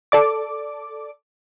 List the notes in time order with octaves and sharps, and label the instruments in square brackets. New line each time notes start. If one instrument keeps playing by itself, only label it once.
[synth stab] A4 D5 D6